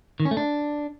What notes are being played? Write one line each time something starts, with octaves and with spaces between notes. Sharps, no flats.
D#3
C#4
A3
D4